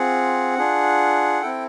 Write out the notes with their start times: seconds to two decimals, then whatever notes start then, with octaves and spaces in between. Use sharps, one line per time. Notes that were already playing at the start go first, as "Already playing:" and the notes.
Already playing: C4 F4 G#4 F#5
0.58 D4 F4 G#4
1.41 C4 E4 A4 G5